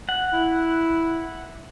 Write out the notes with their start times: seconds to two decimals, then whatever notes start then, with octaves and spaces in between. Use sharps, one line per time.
0.09 F#5
0.33 E4